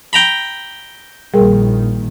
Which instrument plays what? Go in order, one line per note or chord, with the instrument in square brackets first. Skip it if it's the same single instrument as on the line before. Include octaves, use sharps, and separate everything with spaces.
[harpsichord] G5 A#5 B5
[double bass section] A#1 D#3 [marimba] G3 G#4 A#4